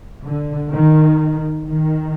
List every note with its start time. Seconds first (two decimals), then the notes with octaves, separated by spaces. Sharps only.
0.23 D3
0.71 D#3
1.67 D#3